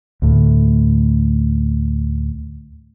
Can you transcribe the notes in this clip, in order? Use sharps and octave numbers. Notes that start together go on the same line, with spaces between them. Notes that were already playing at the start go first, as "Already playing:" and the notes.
D2 A2